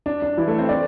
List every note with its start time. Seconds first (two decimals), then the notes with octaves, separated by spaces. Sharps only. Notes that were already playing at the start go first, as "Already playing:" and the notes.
0.06 D4
0.22 D4
0.37 E3 E4
0.48 A3 A4
0.58 C4 C5
0.69 D4 D5